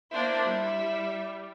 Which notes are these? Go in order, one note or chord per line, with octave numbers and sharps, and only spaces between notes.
A#3 D4 E4 C5
G3